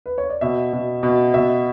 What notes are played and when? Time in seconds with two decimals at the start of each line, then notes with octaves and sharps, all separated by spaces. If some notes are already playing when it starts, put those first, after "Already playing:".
0.06 B4
0.18 C#5
0.30 D5
0.41 B2 E5
0.73 B2
1.03 B2
1.34 B2 E5